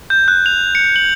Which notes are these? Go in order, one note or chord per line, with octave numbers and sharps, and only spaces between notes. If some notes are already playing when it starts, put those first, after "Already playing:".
G6
F#6
F7
C#7
F#7